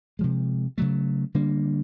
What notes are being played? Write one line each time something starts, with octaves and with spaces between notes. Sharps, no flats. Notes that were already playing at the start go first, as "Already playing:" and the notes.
C3 F3 G#3
C#3 F#3 A3
D3 G3 A#3 D4